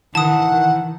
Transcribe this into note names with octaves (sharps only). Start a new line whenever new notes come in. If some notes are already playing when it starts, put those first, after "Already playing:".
D#3 E3 F#5 A5 D#6